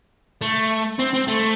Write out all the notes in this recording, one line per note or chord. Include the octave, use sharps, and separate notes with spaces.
A3
C4
C4
A3